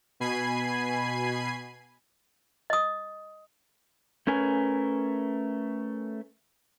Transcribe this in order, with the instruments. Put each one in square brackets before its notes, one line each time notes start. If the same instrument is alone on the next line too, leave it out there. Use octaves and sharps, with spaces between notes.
[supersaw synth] B2 G#5 B5 G#6 C7 D#7
[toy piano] D#5 D#6
[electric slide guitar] A3 C#4 A#4 B4 G#5